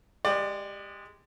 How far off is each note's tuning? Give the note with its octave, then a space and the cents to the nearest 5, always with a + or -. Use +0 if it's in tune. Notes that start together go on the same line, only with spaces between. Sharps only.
G#3 +0 G4 +10 D5 +25